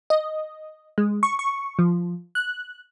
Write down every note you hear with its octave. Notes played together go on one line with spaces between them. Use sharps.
D#5
G#3
C#6
C#6
F3
F#6